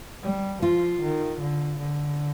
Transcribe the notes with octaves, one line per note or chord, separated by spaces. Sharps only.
G3
F3 F4
D#3
D3
D3